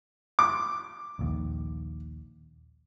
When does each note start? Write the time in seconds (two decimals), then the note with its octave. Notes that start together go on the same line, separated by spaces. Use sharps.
0.39 D6
1.19 A#1 D#2